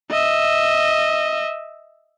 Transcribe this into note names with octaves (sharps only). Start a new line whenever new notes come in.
D#5 E5